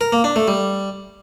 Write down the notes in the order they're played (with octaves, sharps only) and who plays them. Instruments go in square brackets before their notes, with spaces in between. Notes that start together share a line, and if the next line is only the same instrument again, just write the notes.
[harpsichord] A#4
A#3
D4
A3
G3